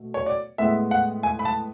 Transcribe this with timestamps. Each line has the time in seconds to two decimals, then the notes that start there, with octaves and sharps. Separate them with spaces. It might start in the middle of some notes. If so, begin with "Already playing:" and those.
Already playing: B2 A3
0.14 C#5
0.26 D5
0.58 A2 G#3 B3 E5
0.91 F#5
1.23 G#5
1.39 B5
1.45 A5